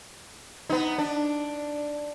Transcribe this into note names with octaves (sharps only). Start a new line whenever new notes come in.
B3 D#4
D4